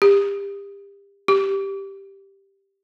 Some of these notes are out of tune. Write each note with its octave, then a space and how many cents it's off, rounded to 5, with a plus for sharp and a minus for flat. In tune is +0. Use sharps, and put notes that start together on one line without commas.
G4 +30
G4 +0